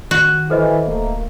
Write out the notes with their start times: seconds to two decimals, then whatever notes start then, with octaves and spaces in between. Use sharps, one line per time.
0.11 D#3 F#4
0.50 E3 A4 C5 D#5
0.87 D1 A3 A#3